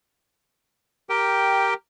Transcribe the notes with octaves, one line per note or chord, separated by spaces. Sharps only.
G4 A#4 G5